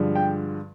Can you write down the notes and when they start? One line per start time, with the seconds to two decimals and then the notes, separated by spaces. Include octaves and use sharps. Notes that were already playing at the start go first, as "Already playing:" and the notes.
Already playing: G2 D3 F3 G#3
0.15 G5